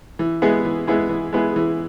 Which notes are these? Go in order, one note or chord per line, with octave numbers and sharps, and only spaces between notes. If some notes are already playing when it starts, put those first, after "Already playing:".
E3
G#3 B3 E4 G#4
E3
G#3 B3 E4 G#4
E3
G#3 B3 E4 G#4
E3